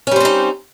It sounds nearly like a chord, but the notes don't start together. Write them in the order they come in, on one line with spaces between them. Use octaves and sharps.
C#4 G3 C5 C4 D#4